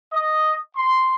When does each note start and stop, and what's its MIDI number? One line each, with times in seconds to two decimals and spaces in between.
0.12 0.59 75
0.76 1.15 84